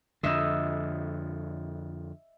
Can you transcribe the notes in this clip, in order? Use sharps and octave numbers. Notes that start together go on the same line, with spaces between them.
F2 D3 D#5 E5 E6